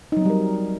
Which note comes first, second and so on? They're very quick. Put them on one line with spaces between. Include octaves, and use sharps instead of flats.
D#4 F#3 C4 G3 A#4